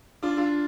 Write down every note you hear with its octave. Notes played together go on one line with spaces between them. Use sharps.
D4 F4
D4 F4